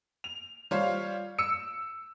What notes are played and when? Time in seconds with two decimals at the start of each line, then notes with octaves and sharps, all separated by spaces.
0.24 F7
0.71 G3 F4 C5 C#5 F5
1.39 E6 C#7